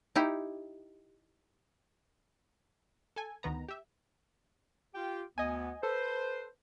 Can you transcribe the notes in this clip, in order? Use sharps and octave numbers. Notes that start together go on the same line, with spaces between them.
D#4 E4 G4
A4 G#5
D2 D#3 B3 A#5
G4 E5
F4 G4 G5
D2 B3 D#5 G#5
A4 B4 C5